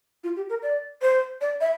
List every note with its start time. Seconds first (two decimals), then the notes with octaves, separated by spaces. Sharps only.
0.24 F4
0.36 G4
0.50 A#4
0.63 D5
1.02 C5
1.41 D5
1.61 E5